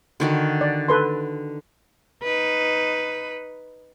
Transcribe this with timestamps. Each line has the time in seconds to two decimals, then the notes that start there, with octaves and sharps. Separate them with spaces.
0.20 D3 D#3 F#4
0.61 D5
0.88 A4 B4 C6
2.23 D#4 B4